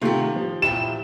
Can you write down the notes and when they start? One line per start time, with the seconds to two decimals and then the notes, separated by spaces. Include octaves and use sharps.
0.02 C3 D#3 A3 F4 G4
0.36 F3
0.62 A#2 E4 G4 E7